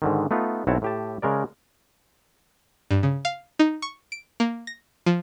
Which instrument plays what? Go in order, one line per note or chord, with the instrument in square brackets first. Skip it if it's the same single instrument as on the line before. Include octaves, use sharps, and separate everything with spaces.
[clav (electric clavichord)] G#2 D3 D#3
A3 B3 D#4 F4
B1 C4 E4 F#4 C#5 A5
A2 G4 A5
C#3 G#3 A#4 D5
[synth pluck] G2
C#3
F5
D#4
C#6
D7
A#3
A#6
F3